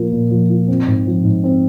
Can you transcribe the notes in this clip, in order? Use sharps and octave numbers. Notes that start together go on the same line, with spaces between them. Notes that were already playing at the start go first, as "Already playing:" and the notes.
Already playing: A#2 F3 A#3 F4
A#2
F3
F4
C4
G#2
F3
G#2
C4